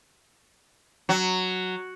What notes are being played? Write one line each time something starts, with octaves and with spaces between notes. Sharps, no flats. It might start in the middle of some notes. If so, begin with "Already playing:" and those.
F#3